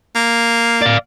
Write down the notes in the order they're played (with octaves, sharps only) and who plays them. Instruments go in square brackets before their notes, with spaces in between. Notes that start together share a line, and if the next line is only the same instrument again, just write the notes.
[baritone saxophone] A#3
[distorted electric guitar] D5 F5